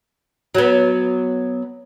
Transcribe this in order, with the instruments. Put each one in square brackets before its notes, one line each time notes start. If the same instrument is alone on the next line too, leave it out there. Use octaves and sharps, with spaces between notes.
[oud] F#3 B3